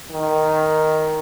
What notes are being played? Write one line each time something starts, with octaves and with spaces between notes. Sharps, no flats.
D#3